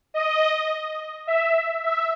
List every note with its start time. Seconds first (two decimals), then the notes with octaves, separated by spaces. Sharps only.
0.14 D#5
1.27 E5
1.84 E5